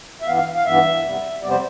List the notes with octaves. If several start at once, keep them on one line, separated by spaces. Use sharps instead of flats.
E5
G2 E3 B3 F5
F5
F5
G2 E3 B3 E5
F2 C3 G3 B3
F2 C3 G3 B3 D5
C5